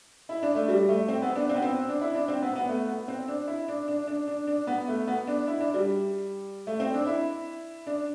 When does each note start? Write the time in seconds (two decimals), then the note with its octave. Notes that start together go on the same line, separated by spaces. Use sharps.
0.29 E4
0.43 D4
0.55 A3
0.69 G3
0.89 A3
1.08 C4
1.22 B3
1.36 D4
1.49 C4
1.55 B3
1.62 C4
1.89 D4
2.01 E4
2.14 D4
2.28 C4
2.42 B3
2.56 B3
2.68 A3
2.88 B3
3.08 C4
3.28 D4
3.47 E4
3.68 D4
3.88 D4
4.07 D4
4.27 D4
4.47 D4
4.67 B3
4.88 A3
5.07 B3
5.27 D4
5.47 E4
5.60 D4
5.74 G3
6.67 A3
6.80 C4
6.94 D4
7.07 E4
7.86 D4